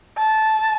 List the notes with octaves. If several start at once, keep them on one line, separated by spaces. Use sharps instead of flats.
A5